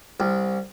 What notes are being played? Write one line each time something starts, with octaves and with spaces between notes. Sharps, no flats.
C2